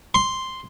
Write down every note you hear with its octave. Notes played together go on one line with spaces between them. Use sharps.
C6